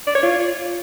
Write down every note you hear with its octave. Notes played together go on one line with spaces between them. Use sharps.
D5
C#5
F4